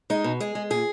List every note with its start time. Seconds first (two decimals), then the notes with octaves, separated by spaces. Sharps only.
0.10 G#3 D#4
0.24 B2
0.40 G#3 G#4
0.55 G#3
0.70 A#2 G#4